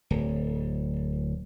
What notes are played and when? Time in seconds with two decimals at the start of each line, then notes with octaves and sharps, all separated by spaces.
0.10 D1